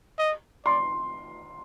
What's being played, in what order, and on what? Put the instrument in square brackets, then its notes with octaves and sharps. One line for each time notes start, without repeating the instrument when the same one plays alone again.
[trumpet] D#5
[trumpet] D5 [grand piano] C6